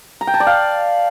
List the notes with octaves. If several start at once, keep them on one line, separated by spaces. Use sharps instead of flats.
A#5
G5
A5
D5
F5